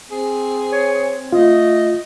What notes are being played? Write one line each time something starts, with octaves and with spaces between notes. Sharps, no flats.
C4 G#4
C#5
A3 F4 D#5